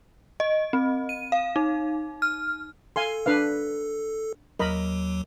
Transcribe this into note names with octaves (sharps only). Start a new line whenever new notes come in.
D#5
C4
D#7
F5
D#4
F6
A4 F5 G#5 C6
D4 B4 F5
D#2 F#3 A#4 D#5 B5